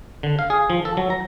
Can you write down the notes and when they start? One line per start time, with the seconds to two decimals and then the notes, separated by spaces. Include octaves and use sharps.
0.23 D3
0.39 F5
0.50 G#4
0.70 F3
0.85 A4
0.97 F#3
1.10 A#5